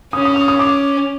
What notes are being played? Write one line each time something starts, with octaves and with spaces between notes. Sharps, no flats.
C#4 D#6
D#6
D#6
D#6
D6